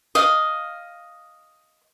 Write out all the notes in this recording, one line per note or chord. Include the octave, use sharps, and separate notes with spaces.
D#5 F5